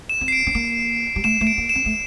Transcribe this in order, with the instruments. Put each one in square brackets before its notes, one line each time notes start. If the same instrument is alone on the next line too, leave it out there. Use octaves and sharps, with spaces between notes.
[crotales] E7
[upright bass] C4
[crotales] C7
D7
[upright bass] C4
A#3
G3
[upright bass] A3 [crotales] E7
[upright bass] A3
[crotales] D7
[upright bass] A#3
[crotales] E7
[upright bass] C4
A3